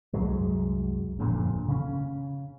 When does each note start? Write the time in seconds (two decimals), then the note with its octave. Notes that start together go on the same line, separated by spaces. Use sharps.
0.13 C2 F#2 F#3 G#3
1.19 G1 F2 A#2 D3
1.68 C#3 C#4